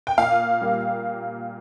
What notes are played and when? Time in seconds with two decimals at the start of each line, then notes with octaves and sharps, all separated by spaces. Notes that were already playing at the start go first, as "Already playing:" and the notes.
0.07 G5
0.18 A#2 F5
0.61 G3 A#3